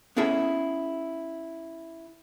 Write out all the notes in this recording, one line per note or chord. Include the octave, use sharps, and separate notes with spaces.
B3 C#4 E4 G#4 A4 E5